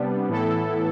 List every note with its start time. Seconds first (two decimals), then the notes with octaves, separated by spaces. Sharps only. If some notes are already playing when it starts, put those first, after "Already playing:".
Already playing: C3 G3 B3 D4
0.29 A2 E3 B3 E4 A4